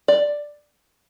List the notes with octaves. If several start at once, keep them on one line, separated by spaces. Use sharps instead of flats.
D5